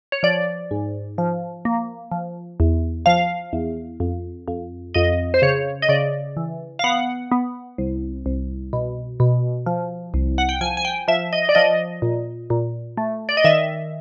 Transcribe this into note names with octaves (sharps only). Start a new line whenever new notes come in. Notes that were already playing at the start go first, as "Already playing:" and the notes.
C#5
F3 D5
G#2
F3
A#3
F3
E2
F3 F5
E2
F2
F2
F2 D#5
C5
C#3 C#5
D#5
C#3 D5
E3
F5
B3 F#5
B3
C2
C2
B2
B2
F3
C2
F#5
G5
F3 G#5
G#5
G5
F3 E5
D#5
D5
F3 D#5
A#2
A#2
A3
D5
D#5
D#3 E5